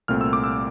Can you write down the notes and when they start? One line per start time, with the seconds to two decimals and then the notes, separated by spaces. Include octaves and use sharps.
0.08 C2 A#2 A3 C4 F6
0.21 E6
0.33 D6
0.44 E6